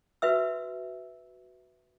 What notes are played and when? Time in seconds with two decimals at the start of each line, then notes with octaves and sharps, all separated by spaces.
0.22 F#4 B4 E5 E6